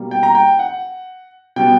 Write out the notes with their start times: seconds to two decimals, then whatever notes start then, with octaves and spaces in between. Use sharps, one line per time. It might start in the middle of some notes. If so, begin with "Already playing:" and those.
Already playing: B2 G3 A#3
0.11 G5
0.23 A#5
0.35 G5
0.59 F#5
1.56 B2 G3 B3 G5